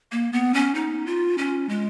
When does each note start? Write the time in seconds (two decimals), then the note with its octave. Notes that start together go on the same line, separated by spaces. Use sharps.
0.12 A#3
0.33 B3
0.54 C#4
0.75 D#4
1.06 F4
1.38 C#4
1.69 G#3